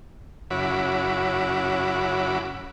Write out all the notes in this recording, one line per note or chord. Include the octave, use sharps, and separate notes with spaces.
F#2 C#3 E4 F#4 B5 D6